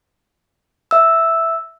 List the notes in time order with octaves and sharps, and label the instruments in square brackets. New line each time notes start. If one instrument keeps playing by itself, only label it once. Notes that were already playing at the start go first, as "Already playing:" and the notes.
[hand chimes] E5 E6